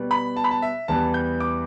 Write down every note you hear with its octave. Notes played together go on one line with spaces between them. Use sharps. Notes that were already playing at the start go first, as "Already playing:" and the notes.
Already playing: B2 G3 B3
B5
A5
B5
A5
E5
E2 E3 G3 B3 A5
G6
D6